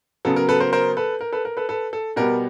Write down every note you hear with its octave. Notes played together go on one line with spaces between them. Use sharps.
C#3 F#3 B3 A4
A#4
A4 B4
A#4 C5
A#4 C5
A4 B4
A#4
A4 B4
A#4
A4 B4
A4 B4
A4
B2 G3 B3 A#4